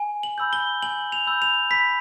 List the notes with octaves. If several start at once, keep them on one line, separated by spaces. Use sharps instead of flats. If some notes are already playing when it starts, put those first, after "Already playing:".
Already playing: G#5
F#7
B5 E6 G6
G7
G#5 F#7
F7
B5 E6 G6
F7
B5 B6